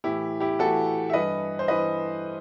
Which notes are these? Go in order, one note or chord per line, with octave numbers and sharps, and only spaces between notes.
A2 E3 E4 G4
E4 G4
A2 E3 F#4 A4
E5
G2 E3 B4 D#5
C5
G2 E3 B4 D#5